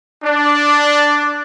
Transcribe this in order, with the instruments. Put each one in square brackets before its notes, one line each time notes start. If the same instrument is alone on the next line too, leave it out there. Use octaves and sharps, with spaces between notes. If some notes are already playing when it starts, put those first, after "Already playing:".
[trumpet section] D4